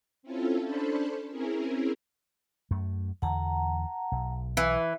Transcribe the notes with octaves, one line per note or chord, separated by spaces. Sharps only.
C4 C#4 E4 F4 A4
C#4 D4 A4 C5 A5 B5
C4 C#4 E4 G#4 A#4
F#2 A3
E2 D3 F#5 A5 A#5
B1
E3